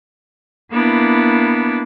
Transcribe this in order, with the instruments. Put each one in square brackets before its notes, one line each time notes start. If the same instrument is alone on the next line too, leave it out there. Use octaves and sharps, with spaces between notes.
[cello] A#3 E4 [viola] B3 D4